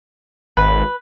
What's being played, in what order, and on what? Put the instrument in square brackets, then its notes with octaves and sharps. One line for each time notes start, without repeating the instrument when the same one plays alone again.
[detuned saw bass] G#1 [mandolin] B4